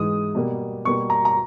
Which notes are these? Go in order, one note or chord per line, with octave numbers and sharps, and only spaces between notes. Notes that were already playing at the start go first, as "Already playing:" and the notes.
Already playing: G#2 E3 G#3 D#6
B2 G3 A#3
B2 G3 A#3 C#6
A#5
A#5